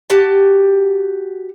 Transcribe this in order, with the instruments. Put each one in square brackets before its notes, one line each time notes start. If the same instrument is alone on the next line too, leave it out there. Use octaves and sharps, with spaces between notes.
[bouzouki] F#4 G4 A5